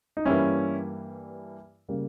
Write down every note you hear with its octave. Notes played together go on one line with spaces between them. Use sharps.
D#4
G2 E3 G3 A#3 C#4 E4
C#3 G3 A#3